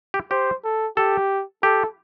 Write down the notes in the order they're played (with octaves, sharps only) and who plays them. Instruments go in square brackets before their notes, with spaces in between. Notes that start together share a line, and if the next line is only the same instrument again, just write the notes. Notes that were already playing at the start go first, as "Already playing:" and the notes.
[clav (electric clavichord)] G4
[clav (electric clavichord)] G4 [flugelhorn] C5
[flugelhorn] A4
[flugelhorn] G4 [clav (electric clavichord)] A4
[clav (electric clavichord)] G4 [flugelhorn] A4